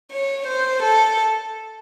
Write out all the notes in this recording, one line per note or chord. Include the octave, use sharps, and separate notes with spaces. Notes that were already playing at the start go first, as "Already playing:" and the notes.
C#5
C5
A4